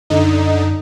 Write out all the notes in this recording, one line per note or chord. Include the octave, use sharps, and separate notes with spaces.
F#2 D3 D#4